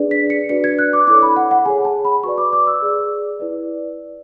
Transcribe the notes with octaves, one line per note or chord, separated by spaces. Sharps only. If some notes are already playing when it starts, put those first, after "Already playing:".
Already playing: D4 G#4 B4 D5
B6
C#7
D4 F#4 B4 D5 C#7
G#6
F#6
D6
E4 A4 C#5 D6
B5
F#5
F#5
G#4 C#5 G#5
A5
B5
F#4 B4 D5 C#6
D6
D6
E6
G#4 D5
E4 B4 D5